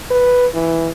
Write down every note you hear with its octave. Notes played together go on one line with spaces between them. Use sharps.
B4
E3